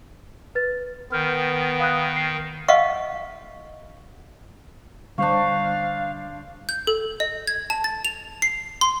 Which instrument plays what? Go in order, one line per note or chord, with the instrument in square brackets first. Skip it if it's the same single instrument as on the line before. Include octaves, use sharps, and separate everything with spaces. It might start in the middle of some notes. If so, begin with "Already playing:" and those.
[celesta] B4 A6
[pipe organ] D#3 [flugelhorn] B3 [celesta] F6 G6
[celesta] F5 D#6 F#6
C7
[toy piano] D#5 F5 F#5 C#6
[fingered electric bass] D3 G3 [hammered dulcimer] D4 C5 C#6 [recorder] F5
[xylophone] G6
A4
D#5
G#6
A5
A6
F7
C7
C6